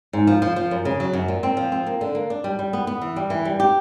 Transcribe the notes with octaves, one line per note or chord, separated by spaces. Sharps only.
G#2
F3
F3
F3
F#2
C#3
F#3
F#2
A#2
C4
F3
C4
A#3
D3
A#3
D4
G3
G3
B3
B3
E3
G3
E3
G3
G4